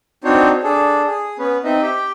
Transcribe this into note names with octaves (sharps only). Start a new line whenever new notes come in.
C4 D4 D#4 F#4 C5 C#5
D4 G#4 A4
G#4
B3 C#4 B4
C4 D#4 D#5 E5
G4 G5